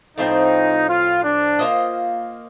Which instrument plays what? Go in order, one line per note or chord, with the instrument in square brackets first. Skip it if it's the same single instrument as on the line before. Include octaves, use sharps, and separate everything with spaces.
[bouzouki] A2 F3 C4 [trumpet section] D#4
[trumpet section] F4
D4
[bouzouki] A#3 F4 C5 D#5